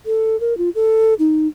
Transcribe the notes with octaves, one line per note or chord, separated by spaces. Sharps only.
A4
A#4
F4
A4
D#4